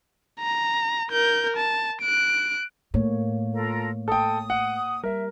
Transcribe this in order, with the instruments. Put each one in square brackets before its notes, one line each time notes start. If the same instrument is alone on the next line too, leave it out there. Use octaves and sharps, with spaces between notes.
[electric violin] A#5
A#4 G6
A5
F#6 D7
[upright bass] A2 [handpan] A#3 C#5
[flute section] F4 A4 A#4
[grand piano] A4 G5 [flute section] D#6
[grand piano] F#5
[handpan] G3 [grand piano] A#4 [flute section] E5